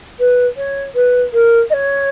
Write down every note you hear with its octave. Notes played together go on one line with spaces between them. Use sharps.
B4
C#5
B4
A#4
D#5
C#5